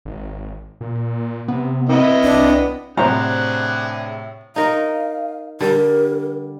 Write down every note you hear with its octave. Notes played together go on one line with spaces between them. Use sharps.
G#1
A#2
C3 B3
B3 C4 E4 D#5
C2 D4
A2 C3 D4 G#4 C5 F#5 A#5 F#6
D#4 A#4 F5
D3 G3 A#4